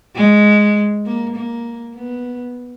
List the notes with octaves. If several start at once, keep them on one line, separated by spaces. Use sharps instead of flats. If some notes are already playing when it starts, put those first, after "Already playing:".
G#3
A#3
A#3
B3